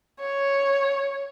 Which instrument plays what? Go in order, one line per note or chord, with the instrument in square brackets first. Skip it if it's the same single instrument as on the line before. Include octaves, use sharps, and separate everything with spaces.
[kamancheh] C#5